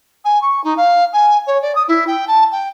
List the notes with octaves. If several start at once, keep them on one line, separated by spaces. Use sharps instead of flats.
G#5
C#6
D#4
F5
G#5
C#5
D5
D#6
E4
G5
A5
G5